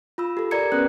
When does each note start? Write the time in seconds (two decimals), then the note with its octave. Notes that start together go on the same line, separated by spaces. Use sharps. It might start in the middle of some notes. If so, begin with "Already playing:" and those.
0.18 F4 B5 E6
0.37 G4 A4
0.51 G4 A#4 D5 A#5 G#6 C#7
0.72 B3 C#4 B4 F#6